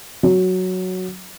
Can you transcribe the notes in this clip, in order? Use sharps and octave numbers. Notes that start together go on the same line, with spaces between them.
F#3